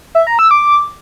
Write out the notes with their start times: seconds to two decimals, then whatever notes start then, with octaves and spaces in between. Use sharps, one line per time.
0.15 E5
0.27 A#5
0.39 E6
0.51 D6